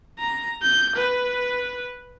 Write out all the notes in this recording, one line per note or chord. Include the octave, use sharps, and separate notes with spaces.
A#5
G6
B4